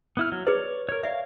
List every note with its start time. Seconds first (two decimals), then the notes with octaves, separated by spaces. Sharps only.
0.17 B3 E4 F6
0.32 F#3
0.47 G#4 B4 C#5 D5
0.89 A#4 C#5
1.03 C#5 D5 E5 F5